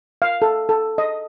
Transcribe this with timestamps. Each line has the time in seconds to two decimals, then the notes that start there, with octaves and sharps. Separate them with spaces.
0.22 F5
0.42 A4
0.69 A4
0.98 D#5